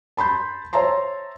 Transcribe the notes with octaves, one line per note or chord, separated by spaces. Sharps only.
A5 B5 C6 G6
C5 C#5 E5 A5 A#5 C6